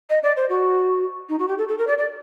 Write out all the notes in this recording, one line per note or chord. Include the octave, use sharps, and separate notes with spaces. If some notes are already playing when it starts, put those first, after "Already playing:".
D#5
D5
C5
F#4
D#4
F#4
G4
A4
A4
A#4
D5
D5